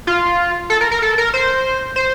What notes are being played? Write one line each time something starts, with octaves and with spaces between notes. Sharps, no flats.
F4
A4
A#4
A#4
A4
A#4
C5
C5